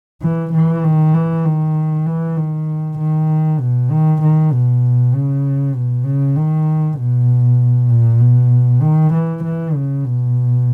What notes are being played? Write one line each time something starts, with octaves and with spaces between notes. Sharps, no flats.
E3
E3
D#3
E3
D#3
E3
D#3
D#3
B2
D#3
D#3
B2
C#3
B2
C#3
D#3
B2
A#2
B2
D#3
E3
E3
C#3
B2